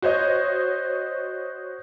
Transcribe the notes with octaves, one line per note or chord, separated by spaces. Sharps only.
F#4 C5 C#5 D#5